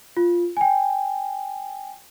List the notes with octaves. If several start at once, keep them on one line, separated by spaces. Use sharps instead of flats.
F4
G5 G#5